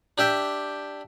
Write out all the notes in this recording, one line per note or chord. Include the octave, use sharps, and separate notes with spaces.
D4 G4 E5 G5